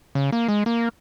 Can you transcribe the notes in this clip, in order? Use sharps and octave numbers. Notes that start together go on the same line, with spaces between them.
C#3
A#3
G#3
A#3